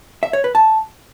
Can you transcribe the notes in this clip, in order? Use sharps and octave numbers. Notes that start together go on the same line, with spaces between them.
E5
C#5
B4
A5